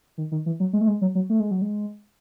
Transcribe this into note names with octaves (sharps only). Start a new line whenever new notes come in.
D#3
D#3
E3
F#3
G#3
A3
G#3
F#3
F#3
A3
G#3
F#3
G#3